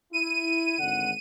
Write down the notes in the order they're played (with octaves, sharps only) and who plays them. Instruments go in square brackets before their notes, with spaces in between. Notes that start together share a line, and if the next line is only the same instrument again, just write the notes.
[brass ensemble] E4 [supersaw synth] D#7
[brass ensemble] G#1 D3 F#5